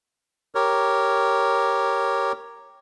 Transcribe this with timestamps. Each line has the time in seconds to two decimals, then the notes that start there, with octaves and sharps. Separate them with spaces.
0.55 G4 A#4 C#5